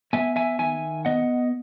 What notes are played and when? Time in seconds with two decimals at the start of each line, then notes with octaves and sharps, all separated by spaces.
0.13 B3 E5 G#5
0.36 E5 G#5
0.59 D#3 E5 G#5
1.05 B3 D#5 F#5